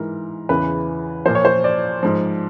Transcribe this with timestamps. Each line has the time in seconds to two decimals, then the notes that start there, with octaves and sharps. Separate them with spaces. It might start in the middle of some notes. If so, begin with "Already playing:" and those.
Already playing: G#2 E3 A#4
0.49 E2 C#3 E3 B4
1.25 A#2 F3 C5
1.35 C#5
1.45 C5
1.64 D5
2.03 G#2 F3